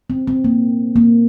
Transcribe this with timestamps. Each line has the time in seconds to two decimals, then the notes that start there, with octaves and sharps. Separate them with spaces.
0.10 C4
0.27 C4
0.44 A#3
0.96 A#3